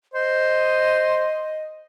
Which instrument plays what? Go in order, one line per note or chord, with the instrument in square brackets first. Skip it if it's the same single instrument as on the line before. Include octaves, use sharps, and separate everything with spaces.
[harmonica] C5 [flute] D#5